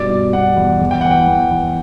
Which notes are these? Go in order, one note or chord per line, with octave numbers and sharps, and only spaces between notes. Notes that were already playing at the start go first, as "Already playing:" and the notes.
Already playing: G2 B2 D5
B2
B2 F#5
E2
E2
G5
E3 F#5
G5
E2
E3